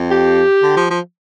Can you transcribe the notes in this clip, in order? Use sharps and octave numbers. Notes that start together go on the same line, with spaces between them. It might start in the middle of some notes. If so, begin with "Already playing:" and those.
Already playing: F2
G4
D3
F3
F3